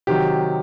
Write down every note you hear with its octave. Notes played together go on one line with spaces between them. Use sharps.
C3 D#3 F#3 G4